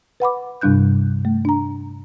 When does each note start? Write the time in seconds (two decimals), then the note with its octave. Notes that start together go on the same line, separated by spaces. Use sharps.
0.20 B4 F#5 B5 D6
0.61 G2 C3 G3 D4 F#6 G6
1.25 A3
1.45 D4 A#5